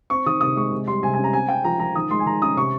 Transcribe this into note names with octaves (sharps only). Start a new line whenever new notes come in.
C4 C#6
D#3 D#6
C3 D#6
G#3 C#6
C3
G3 C6
C3 G#5
G#5
C#4
A#5
C4 G#5
C4 G5
F3 A#5
F3 A#5
D#3 D#6
G#3 C6
G#5
D#3 A#5
C#4 D#6
C3 C#6